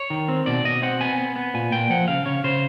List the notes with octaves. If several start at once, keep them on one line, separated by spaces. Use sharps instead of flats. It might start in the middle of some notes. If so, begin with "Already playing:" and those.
Already playing: C#5
D#3
C4
B2 D5
B2 D#5
C4 F#5
B3 G#5
B3
B3
A#2 G#5
A#2 G5
F3 F#5
C#3 F5
C#3 C#5
C#3 C5